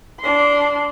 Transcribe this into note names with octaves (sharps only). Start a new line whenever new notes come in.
D4 C6